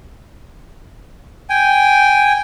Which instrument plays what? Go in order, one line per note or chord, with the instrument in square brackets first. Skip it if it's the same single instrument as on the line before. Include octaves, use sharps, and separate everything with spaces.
[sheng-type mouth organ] G5 G#5